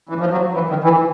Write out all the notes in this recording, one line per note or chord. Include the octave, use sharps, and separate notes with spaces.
E3
F3
F#3
E3
D#3
E3